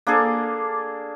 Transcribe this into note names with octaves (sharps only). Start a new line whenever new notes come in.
A#3 D4 G#4 A4